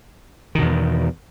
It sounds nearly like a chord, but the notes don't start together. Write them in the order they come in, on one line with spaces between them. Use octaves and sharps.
D#3 B2 E2